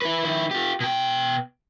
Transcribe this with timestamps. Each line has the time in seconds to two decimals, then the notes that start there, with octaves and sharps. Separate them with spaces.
0.02 E4 B4
0.25 D#3 E4
0.51 F4 G4
0.80 B2 G5